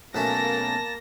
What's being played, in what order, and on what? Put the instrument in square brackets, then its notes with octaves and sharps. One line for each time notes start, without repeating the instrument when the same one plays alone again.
[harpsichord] B1 A3 C#4 [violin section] A#3 A#6 [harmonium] A5